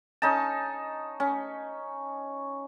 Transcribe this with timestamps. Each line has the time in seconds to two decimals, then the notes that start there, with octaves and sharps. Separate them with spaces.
0.22 C#4 D#4 A5
1.20 C#4